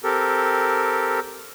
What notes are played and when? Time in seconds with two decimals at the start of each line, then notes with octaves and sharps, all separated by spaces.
0.04 C4 G4 A4 A#4